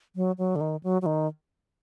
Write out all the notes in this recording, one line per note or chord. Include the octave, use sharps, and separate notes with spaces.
F#3
F#3
D3
D#3
F#3
F#3
D#3